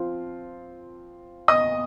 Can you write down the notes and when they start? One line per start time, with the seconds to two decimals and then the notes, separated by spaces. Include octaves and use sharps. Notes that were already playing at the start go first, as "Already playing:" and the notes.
Already playing: F3 C4 F4
1.48 D#5 D#6